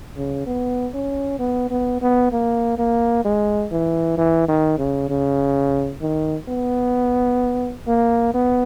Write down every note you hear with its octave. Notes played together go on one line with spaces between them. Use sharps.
C#3
B3
C#4
B3
B3
B3
A#3
A#3
G#3
E3
E3
D#3
C#3
C#3
D#3
B3
A#3
B3